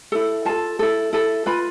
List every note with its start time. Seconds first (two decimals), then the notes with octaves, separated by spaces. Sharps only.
0.12 E4 A4
0.45 F4 A4 A5
0.79 E4 A4
1.13 E4 A4
1.46 F4 B4 B5